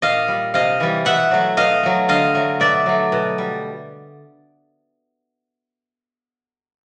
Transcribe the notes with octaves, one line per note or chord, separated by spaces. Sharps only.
A#2 D#5 F5
G3
C3 D#5 F5
E3 G3
B2 E5 F#5
F#3 A3
B2 D#5 F5
F#3 A3
D3 D#5 F5
F#3 A3
B2 D5 E5
F#3 A3
B2
G3